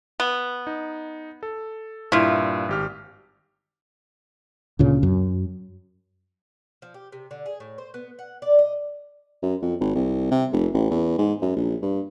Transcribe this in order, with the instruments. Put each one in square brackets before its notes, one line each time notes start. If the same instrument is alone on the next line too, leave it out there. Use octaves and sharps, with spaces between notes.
[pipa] B3
[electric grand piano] D#4
A4
[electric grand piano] G2 A#2 [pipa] E4 F4
[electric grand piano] G#1 G4 F6
[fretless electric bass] D2 A#2 C#3
F#2
[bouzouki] F3
G4
C3
D3
G#4
A2
C5
B3
F#5
D5
D#5
[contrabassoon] F#2
F2
G#1
C2
C3
F1
A1
E2
G#2
F#2
A#1
G2